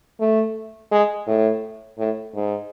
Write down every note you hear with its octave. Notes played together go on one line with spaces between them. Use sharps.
A3
G#3
A2
A2
G#2